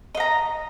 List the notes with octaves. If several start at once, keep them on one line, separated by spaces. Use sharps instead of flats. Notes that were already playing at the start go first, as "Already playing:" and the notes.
D#5 F5 A#5